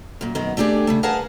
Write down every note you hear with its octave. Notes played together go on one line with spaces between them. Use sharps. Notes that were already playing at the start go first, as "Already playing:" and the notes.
F#2 A#2
F#2 B2 D#3 B3
A3 D4 G4 G#4 D5
C#3 G3 A3
G#4 A#4 B4 F5 F#5 A5